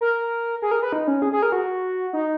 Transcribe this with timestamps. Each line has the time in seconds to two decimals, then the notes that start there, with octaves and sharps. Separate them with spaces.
0.01 A#4
0.62 G#4
0.71 A#4
0.83 B4
0.93 D#4
1.08 C#4
1.22 G#4
1.33 G#4
1.42 A#4
1.52 F#4
2.13 D#4